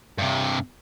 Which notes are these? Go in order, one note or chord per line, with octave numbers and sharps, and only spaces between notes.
G2 C3